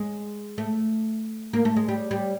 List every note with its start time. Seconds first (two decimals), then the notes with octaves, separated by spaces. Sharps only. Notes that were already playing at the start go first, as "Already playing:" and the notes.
Already playing: G#3
0.58 A3
1.53 A#3
1.65 A3
1.76 G#3
1.88 G3
2.11 G3